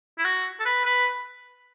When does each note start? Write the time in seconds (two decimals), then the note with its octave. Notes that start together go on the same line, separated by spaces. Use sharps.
0.18 E4
0.25 F#4
0.59 A4
0.65 B4
0.85 B4